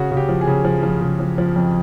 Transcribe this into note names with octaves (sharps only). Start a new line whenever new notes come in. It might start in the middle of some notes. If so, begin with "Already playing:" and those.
Already playing: C#3 F#4
C#3
G4
F3
G#4
C#3
F3
F3
C#3
F3
F3
F2